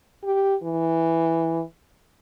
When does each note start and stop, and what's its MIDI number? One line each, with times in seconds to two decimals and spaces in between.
0.23 0.55 67
0.63 1.62 52